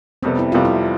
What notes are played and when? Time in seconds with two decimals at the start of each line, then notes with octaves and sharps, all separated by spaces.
0.23 F2 C3 G3 B3 C4
0.39 E4
0.52 F2 C3 G3 B3 F4
0.65 E4